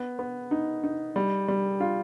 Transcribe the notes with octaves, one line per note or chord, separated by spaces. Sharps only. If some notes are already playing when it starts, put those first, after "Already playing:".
Already playing: B3
B3
D#4
D#4
G3
G3
F4